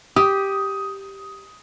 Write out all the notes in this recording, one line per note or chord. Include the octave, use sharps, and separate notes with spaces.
G4 D#6